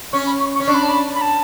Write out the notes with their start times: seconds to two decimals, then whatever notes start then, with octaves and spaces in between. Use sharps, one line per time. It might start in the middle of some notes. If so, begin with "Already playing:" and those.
0.13 C#4 C#6
0.26 B5
0.40 C#6
0.55 C#6
0.60 C#4
0.67 D4 C#6
0.75 B5
0.83 A5
0.89 B5
1.15 B5
1.21 A5